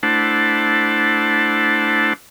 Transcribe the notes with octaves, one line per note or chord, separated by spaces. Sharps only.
A3 D4 E4 C5 F#5 A5